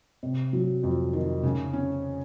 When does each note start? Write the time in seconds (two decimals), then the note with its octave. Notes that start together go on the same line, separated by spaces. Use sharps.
0.23 C3
0.53 F#3
0.83 F2
1.13 D#3
1.43 C#3
1.73 C#4